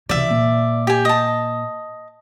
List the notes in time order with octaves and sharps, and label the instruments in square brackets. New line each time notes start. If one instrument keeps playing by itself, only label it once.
[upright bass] C3 E3 [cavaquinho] D5 E5
[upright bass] A#2
[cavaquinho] G4 G#5
D#5 A5